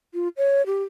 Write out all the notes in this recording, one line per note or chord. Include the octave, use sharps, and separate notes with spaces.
F4
C#5
G4